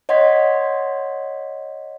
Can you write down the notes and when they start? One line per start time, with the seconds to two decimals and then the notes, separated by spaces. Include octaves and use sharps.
0.09 C#5 D#5 F#5 C6 G#6 B6